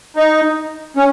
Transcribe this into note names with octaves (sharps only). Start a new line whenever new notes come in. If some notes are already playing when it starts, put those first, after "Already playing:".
D#4
C#4